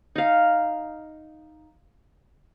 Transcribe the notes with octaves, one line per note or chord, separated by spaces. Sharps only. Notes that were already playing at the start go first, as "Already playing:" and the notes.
D#4 F5